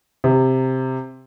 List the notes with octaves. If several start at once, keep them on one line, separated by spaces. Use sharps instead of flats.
C3